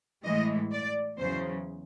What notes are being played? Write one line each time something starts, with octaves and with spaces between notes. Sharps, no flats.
A2 E3 G#3 D#5
D5
E2 C#3 F#3 C5